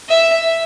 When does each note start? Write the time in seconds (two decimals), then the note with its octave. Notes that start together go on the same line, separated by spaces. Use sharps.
0.09 E5